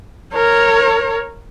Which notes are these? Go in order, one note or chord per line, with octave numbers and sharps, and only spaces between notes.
A#4 C#5